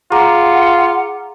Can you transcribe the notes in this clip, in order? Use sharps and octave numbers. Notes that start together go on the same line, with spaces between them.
F4 G#4 F#5 A#5 D6